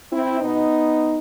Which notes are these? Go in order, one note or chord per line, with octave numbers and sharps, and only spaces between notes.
C4 E4
B2 B3 D#4